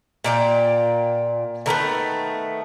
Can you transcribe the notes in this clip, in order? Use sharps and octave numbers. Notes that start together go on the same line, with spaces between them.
A#2 D5 G5
D3 D#3 A3 B3